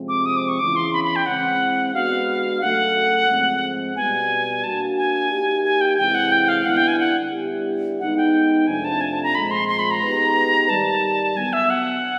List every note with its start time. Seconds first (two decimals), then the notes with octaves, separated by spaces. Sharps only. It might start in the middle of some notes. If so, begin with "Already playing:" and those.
Already playing: C3 F3 G#3 C4
0.08 D6
0.26 D#6
0.37 D6
0.48 C#6
0.59 E2 C#3 E3 D6
0.76 C6
0.93 B5
1.04 B5
1.16 G5
1.26 E3 G#3 C4 F#5
1.94 G#3 B3 D4 F#4 F5
2.61 C#3 F#3 A3 F#5
3.29 G#2 F3 G#3 C4
3.95 B2 G3 B3 G#5
4.64 A#3 D4 F#4 A5
4.98 G#5
5.30 A#3 D#4 G4
5.64 G#5
5.81 G5
5.98 C3 E3 G#3 C4 E4 G5
6.15 F#5
6.32 G5
6.48 F5
6.65 D3 G3 B3 E4 F#5
6.77 G5
6.88 G#5
6.99 F#5
7.32 D3 G3 B3 E4 G4
8.00 G#3 B3 D#4 F#5
8.17 G5
8.67 F2 C3 F3 A3 D4 G#5
8.85 A5
9.01 G#5
9.12 A5
9.23 A#5
9.35 A#2 F3 G#3 C4 B5
9.51 C6
9.68 C6
9.79 B5
9.91 A#5
10.02 G#3 B3 D#4 G4 B4
10.69 G#2 D#3 G3 A5
11.36 D3 F#3 B3 G#5
11.53 E5
11.70 F#5